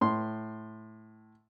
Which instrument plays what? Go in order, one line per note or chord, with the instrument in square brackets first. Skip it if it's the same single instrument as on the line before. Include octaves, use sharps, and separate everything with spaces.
[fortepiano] A2 C6